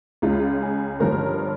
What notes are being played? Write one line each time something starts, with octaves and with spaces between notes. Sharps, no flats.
C#2 C#3 G#3 F4
G#4
G1 G2 F3 A#4